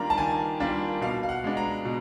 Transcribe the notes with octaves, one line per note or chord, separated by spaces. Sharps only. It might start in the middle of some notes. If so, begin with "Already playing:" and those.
Already playing: D#3 G3 A#3 D4 F4 A#5
A5
D#3 G#5
G3 A#3 D4 F4
B2 F5
F5
F#5
G#3 B3 D4
A#5
B2